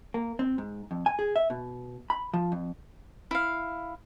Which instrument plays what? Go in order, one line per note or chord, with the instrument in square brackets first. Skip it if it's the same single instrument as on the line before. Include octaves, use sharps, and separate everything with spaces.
[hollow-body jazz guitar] A#3
C4
G#2
F2
G#5
G#4
E5
B2
B5
F3
F2
[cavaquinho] E4 F5